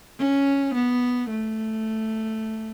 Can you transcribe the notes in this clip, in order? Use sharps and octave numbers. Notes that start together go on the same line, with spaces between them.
C#4
B3
A3